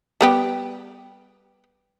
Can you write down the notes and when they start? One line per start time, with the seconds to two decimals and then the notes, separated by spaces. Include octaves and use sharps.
0.21 G3 B3 G4